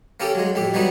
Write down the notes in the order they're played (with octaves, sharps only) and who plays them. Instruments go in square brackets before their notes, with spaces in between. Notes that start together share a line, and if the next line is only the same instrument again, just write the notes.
[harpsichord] A#3 C#4 G4 A4
F#3 G#3
F2 A2 G4
F#3 G3 B3 D#4 F#4